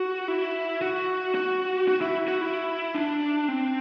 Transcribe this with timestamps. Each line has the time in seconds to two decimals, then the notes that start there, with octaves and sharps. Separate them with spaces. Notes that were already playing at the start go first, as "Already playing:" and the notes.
Already playing: F#4
0.28 E4
0.82 F#4
1.35 F#4
1.88 F#4
2.01 E4
2.28 F#4
2.41 E4
2.95 D4
3.48 C4